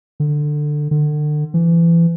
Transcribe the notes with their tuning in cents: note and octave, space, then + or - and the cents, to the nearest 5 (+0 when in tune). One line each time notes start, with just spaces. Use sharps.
D3 +15
D3 +35
E3 +30